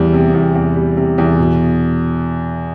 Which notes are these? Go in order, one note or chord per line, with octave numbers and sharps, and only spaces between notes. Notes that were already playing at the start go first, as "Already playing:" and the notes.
Already playing: E2 G3
C3
E2
E2
G3
C3
E2
B2